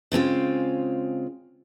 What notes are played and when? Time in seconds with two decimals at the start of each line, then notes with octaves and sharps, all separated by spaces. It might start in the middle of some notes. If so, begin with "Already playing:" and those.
0.12 C#3 G#3 C4 F4